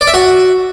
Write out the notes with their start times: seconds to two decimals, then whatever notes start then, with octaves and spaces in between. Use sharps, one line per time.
0.01 D5
0.07 E5
0.14 F#4